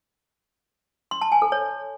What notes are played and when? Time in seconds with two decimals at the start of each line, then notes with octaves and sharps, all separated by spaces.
1.11 C6
1.22 A5
1.32 G#5
1.42 A4
1.52 C#5